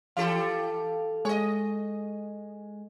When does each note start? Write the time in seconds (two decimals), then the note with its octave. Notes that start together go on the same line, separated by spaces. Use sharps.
0.17 E3 G4 A4 F5
1.25 G#3 C#5 D#5